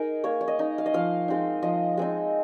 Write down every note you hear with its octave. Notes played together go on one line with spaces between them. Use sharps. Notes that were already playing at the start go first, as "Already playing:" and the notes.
Already playing: D#4 G#4 A#4
A#3 C#5
C#5
D#5
D#4
F5
D#5
F3 F5
G#3 C4 D#4
F3 D#5
G#3 C4 D#4